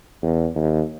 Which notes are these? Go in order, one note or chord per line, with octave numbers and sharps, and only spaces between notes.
E2
D#2